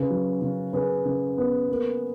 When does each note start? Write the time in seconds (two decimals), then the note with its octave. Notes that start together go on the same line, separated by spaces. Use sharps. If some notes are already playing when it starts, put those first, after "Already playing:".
Already playing: C#3 G#4 B4
0.10 F#3
0.42 C#3
0.73 C#3 G#4 B4
1.05 C#3
1.38 B3
1.68 A#3